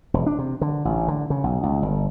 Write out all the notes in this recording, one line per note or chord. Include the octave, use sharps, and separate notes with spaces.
E1
D4
C3
D3
A1
D3
C#3
B1
C#2
G1